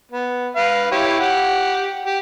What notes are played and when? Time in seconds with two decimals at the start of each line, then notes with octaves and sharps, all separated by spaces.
0.12 B3
0.56 B4 F5
0.91 E4 G4 C#5
1.20 G4 F#5
2.06 G4